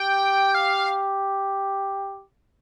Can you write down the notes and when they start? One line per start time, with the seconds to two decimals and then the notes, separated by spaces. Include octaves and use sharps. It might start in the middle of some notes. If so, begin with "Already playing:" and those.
Already playing: G4 G5
0.55 F5